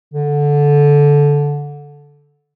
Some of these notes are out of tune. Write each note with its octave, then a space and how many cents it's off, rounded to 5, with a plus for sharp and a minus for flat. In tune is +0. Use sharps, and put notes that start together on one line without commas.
D3 -15